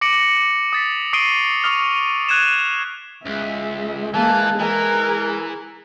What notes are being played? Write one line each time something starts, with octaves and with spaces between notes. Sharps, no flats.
D6 A#6 C#7 D7 F#7
D#6 A6 B6
C#6 D#6 C7 D7 D#7 G7
C#6 D#6 F6 F7
F#6 G#6 D#7 E7
C#2 G#3 E5
E3 A#3 A5
E3 G#4 A#4